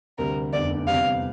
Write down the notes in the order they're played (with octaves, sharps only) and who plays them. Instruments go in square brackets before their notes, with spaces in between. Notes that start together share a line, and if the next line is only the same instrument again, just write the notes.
[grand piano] D2 C3 G3 [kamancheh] A#4
[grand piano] F1 E2 D3 [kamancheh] D5
[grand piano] E2 C3 G3 [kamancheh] F5